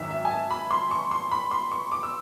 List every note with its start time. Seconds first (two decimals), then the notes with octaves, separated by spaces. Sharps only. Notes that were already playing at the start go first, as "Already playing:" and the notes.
Already playing: G#1 F#2 D#3 E5
0.10 E5
0.25 G#5
0.31 A5
0.51 B5
0.71 C6
0.91 C#6
1.11 C6
1.31 B5
1.51 C6
1.71 C#6
1.92 D6
2.03 E6